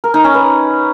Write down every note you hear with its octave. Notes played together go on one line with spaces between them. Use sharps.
A#4
D#4
C#4
B4